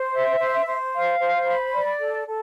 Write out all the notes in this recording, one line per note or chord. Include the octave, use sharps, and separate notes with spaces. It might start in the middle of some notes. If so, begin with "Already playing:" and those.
Already playing: C5
E5
C5
C5
F5
C5
B5
D5
A4
A4